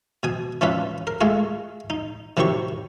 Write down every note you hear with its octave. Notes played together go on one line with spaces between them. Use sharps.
B2 G#5 D#6
E3 C#4 D4 F4 B4 E5
A#4
G#3 A3 F4 G#4
D#4
C3 D#3 F#3 E4 G4 C#6